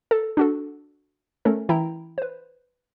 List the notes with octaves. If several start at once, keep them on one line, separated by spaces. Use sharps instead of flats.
A4
D4 F#4 A4
A3 C#4 A4 A#4
E3 E4 G5 A#5
B4 C5